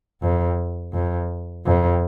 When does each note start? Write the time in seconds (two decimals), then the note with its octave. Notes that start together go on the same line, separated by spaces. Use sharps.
0.22 F2
0.94 F2
1.66 F2